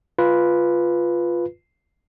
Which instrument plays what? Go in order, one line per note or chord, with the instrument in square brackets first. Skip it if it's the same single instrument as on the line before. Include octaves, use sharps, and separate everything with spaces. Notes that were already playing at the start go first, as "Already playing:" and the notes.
[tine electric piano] F4 B4